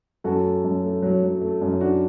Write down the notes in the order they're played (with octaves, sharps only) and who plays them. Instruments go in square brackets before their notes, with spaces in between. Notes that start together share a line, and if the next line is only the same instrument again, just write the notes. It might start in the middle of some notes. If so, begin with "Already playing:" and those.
[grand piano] F#2 F#4 A4
A3
F#2
A3
F#3
F#3
A3
F#2
D4 F#4